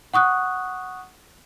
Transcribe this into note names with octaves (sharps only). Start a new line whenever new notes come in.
F#5 C#6 D#6 F#6